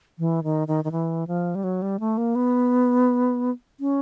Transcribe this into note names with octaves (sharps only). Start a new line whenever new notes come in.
E3
D#3
D#3
D#3
E3
F3
G3
F#3
G3
A3
A#3
B3
C#4